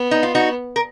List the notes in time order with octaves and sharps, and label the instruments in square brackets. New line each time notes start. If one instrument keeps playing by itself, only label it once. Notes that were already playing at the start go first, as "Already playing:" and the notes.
Already playing: [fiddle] B3
[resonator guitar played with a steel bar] D#4
F4
D#4 F#4
A#4